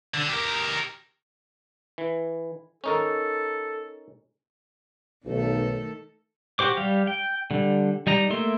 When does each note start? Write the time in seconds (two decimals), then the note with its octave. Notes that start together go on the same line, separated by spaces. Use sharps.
0.14 D3
0.28 G4 A#4
1.98 E3
2.84 C#4 D#4 A4 A#4
5.25 B1 D#3 A3 A4
6.59 F#4 G4 C5 D6
6.77 G3 G4 F5
7.07 G5
7.51 D3 G3
8.07 G3 D#4 A#5
8.30 A3 A#3 E5 C6